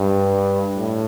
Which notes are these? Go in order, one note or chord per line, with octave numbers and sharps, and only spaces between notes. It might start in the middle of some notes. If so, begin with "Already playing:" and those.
Already playing: G2
A2